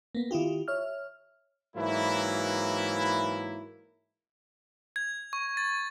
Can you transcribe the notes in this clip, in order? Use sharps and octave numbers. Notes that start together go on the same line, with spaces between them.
A#3 B3
D#3 E4 F4 G4
C#5 E5 F6
G#2 E3 F#3 A#3 E4
G#6
C#6
A6